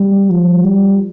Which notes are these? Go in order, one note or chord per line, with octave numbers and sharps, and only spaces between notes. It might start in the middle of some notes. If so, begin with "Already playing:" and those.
Already playing: G3
F3
G3